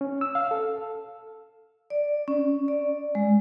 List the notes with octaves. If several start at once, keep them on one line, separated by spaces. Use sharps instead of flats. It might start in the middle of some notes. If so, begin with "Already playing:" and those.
C#4
E6
F5
A4
D5
C#4
D5
G#3